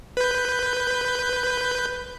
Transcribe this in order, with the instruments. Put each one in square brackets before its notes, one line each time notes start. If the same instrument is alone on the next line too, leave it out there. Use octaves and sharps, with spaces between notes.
[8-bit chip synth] B4 G6